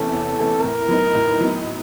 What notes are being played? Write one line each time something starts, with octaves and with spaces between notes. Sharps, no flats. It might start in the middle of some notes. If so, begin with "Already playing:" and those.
Already playing: E2 C3 E3 A3 C#4 A4
E2
C3 E3 A3 C#4
A2 A#4
F#3 B3 D#4
A2
F#3 B3 D#4